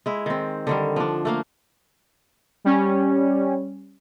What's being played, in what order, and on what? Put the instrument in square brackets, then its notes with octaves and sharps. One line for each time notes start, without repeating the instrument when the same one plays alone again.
[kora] G#3 E4
D#3 C4
D3 D#3 G3
F3 D4
A3 A#3 F5
[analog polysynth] G3 C#4